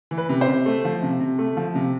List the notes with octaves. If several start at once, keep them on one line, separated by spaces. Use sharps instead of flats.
E3
B4
C3
C5
C3
A3
F3
C3
C3
A3
F3
C3